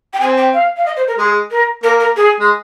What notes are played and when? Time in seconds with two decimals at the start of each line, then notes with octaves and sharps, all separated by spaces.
0.13 G5
0.21 C4 G#5
0.37 G5
0.54 F5
0.77 F5
0.86 D#5
0.97 C5
1.07 A#4
1.18 G#3 G#4
1.51 A#4
1.83 A#3 A#4
2.00 A#4
2.16 G#4
2.40 G#3